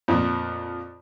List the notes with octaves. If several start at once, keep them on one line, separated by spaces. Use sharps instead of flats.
F2 A#2